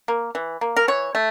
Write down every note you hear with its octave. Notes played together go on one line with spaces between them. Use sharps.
A#3
E3
A#3
A#4
E3 C#5
A3